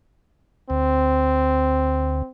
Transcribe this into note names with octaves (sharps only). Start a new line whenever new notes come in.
D2 C4